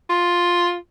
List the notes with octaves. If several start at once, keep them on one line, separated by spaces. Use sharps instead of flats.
F4